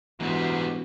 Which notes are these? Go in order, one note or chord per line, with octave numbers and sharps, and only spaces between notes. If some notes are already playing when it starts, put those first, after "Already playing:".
E1 G#2 E3 G3 F#4